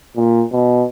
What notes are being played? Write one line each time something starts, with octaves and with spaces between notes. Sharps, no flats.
A#2
B2